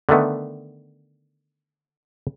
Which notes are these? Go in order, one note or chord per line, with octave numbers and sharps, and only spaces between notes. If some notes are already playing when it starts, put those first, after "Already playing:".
D3 D#3 A3 B3